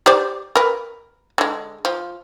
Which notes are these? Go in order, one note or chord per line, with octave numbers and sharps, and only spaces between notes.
G4 C5 D5
A#4 B4
D3 G#3
F3